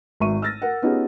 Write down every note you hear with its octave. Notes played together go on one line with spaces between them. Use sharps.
G#1 E5 C#6 D#7
E6 F6 A6 A#6
A#4 F#5
B3 C#4 D#4 F4 G4 G#4